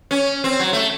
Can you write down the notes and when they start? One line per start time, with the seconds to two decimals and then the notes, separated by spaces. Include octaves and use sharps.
0.11 C#4
0.44 C4
0.59 F#3
0.73 A3